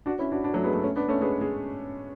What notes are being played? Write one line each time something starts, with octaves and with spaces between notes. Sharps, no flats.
D4 F#4
C#4 E4
D4 F#4
D4 F#4
F#3 A3
G#3 B3
F#3 A3
A3 C#4
B3 D4
A3 C#4
G#3 B3
G#3